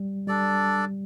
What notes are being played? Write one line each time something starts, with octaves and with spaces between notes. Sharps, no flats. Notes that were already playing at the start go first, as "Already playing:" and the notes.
Already playing: G3
G3 D4 A4 D5